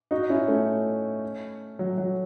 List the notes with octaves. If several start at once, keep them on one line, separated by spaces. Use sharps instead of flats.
D#4 F#4
C#4 E4
A3 C#4
F#3
F#3